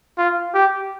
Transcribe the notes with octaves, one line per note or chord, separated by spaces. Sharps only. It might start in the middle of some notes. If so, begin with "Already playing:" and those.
F4
G4